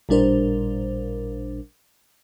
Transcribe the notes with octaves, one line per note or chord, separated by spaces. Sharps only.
A1 A#2 G3 D4 A#4 C5